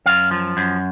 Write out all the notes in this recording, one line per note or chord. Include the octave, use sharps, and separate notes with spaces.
F#2 F5
F3
F#2